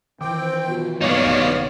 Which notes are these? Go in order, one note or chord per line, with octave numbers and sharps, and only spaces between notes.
D#3 E3 C4 G5 D6
B1 F4 F#4
A1 G2 A#3 B3 D#4 C#5 D5 F5
A#1 C3 D#3